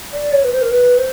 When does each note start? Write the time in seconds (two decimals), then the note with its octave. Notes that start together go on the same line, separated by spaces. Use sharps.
0.13 D5
0.32 C#5
0.44 B4
0.52 C5
0.62 A#4
0.71 B4
0.98 C5